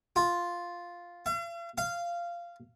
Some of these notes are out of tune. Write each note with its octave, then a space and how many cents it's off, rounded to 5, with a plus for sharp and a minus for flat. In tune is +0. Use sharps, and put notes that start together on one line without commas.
F4 +0
F5 -45
F5 -15